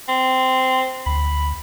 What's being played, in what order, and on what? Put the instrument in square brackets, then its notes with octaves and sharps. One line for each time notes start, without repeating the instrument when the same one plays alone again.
[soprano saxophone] C4
[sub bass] D2 [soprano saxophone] B5